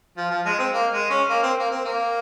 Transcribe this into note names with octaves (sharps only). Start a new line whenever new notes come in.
F3
F3
G#3
C4
A#3
G#3
C#4
A#3
C4
A#3
C4
A#3